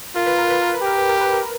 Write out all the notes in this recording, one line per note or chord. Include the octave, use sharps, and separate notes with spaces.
F4 A#4
B4
A#4
B4
A#4
B4
G4 A#4
B4
A#4
B4
A#4